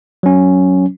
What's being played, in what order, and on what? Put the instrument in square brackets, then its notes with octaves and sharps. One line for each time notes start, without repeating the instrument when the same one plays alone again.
[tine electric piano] F#3 C#4